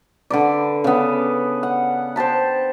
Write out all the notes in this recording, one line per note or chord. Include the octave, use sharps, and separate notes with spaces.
D3 B4 D5
C#3 B3
F#5
C5 G5 A5 B5